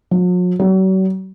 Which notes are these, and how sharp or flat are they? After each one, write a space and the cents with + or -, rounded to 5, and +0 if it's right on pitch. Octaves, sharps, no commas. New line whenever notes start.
F#3 -45
F#3 +40